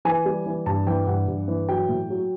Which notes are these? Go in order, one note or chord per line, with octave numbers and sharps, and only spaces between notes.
E3 G#5
G3
E3
G2 A5
E3 G5
G2 F#5
G2
E3
F#3 G5
A2
F#3